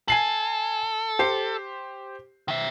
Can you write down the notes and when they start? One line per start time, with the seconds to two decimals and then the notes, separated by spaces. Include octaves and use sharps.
0.08 A4 G#5 C7 F#7
1.19 G4 C5 C7
2.48 D#3 E5